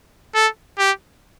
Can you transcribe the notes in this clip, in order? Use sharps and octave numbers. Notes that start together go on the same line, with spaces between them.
A4
G4